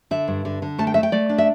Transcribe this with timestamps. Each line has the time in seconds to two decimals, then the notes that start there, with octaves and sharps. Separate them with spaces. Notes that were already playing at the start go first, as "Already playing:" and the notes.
0.11 D3 E5
0.28 G2
0.45 D3
0.62 D3
0.78 A3 A5
0.87 G5
0.94 A3 E5
1.03 G5
1.12 A3 D5
1.29 D4
1.38 E5